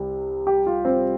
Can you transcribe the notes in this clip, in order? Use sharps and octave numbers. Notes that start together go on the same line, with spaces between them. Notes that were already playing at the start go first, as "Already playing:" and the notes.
Already playing: C2 C3
G4
F4
C4